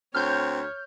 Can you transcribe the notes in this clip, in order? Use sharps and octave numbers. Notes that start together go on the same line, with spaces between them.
D2 C4 C#5 F6 G6